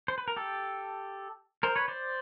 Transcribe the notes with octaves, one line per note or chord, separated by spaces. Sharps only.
C5
B4
A#4
G4 A4
A#4 C5
B4 C#5
C5 D5